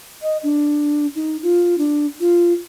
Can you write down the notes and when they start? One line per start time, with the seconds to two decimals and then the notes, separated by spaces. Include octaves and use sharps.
0.22 D#5
0.43 D4
1.15 D#4
1.43 F4
1.78 D4
2.20 F4